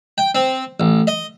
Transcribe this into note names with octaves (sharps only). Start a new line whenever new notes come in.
G5
C4
A1
D#5